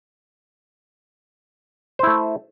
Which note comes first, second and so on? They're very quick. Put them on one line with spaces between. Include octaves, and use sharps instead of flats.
C5 E4 A3